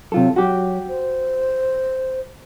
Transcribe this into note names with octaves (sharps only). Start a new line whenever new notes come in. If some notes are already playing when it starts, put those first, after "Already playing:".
C3 F#3 F4 A4
F#3 F#4 G4
C5